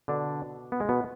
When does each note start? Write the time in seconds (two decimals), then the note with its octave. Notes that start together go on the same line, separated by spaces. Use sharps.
0.08 B2 D3 D4
0.72 B3
0.80 G#3
0.89 B2 B3